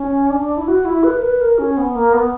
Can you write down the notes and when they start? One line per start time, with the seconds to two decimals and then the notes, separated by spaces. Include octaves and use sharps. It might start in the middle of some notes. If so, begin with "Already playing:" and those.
Already playing: C#4
0.30 D4
0.57 E4
0.68 F#4
0.85 E4
1.03 B4
1.18 A#4
1.22 B4
1.41 A#4
1.58 C#4
1.77 B3
1.95 A#3
2.13 B3